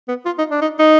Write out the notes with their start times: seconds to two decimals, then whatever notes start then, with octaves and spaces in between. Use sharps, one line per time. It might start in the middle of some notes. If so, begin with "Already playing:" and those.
0.08 B3
0.25 F4
0.38 D#4
0.51 D4
0.61 D#4
0.79 D#4